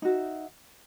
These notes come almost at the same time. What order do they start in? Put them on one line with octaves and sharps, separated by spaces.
D#4 F#4 E5